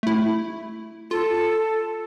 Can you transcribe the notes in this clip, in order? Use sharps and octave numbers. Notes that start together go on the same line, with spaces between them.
A3 E4
F4 A4